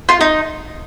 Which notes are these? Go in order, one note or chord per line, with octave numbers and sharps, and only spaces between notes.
F4
D#4